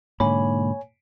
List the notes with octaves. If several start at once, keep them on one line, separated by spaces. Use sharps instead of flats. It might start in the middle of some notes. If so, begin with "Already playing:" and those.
B1 G#2 D3 A#3 C#5 G#5 B5